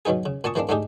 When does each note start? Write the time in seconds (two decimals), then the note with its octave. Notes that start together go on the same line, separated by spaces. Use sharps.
0.05 B2 F#3 B3 D#4 G#4
0.26 C#3
0.44 A#2 G#5 A5 C#6 D#6
0.55 E3 G#3 A#3 C4 D4
0.69 G#2 A3 D4 D#4 G4 G#4